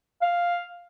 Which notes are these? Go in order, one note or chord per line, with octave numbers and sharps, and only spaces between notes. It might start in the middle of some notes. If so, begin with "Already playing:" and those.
F5